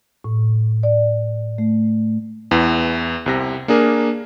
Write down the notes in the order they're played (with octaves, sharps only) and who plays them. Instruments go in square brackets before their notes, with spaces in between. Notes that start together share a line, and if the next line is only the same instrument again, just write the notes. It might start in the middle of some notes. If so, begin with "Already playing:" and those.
[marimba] A2
D5
A3
[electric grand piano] E2 E3
C2 C3 A#6
A#3 D4 G#4 A#4